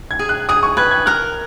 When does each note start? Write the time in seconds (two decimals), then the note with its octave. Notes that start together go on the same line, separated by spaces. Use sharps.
0.11 G#6
0.19 G#4
0.29 F#6
0.49 G#4 D#6
0.63 C#6
0.77 B4 G#6
0.91 G#6
1.06 A#4 F#6